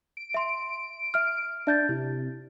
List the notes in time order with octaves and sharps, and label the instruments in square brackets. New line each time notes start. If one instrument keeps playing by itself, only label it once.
[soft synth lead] D7
[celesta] E5 C6
E5 F6
[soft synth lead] D4 [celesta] E5 G6 A6
[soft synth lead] C3 [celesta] E4